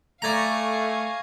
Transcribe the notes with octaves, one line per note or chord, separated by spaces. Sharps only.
A3 D5 F5 G#5 A#5 C#6 G#6 A#6